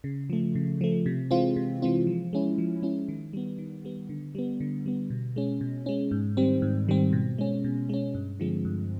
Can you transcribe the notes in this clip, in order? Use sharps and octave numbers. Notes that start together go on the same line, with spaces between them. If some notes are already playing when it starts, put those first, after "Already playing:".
C#3
F3 A3
C#3
F3 A3
C3
E3 G#3 C4 F4
C3
E3 G#3 C4 F4
F3
G#3 C#4 E4
F3
G#3 C#4 E4
D#3
G3 B3
D#3
G3 B3
D3
G3 B3
D3
G3 B3
B2
G#3 C#4
B2
G#3 C#4
G#2
D#3 G3 C4
G#2
D#3 G3 C4
B2
G#3 C#4
B2
G#3 C#4
G2
D3 F3 G#3 C4
G2